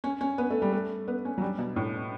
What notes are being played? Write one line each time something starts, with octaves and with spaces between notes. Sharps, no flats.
C#4
C#4
B3
A3
G3
A3
B3
C#4
F#3
G3
B2
A2